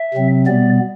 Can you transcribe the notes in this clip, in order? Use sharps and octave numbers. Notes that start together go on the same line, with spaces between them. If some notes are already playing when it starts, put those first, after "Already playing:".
Already playing: E5
C3 F#3 C4
B2 G3 B3 D5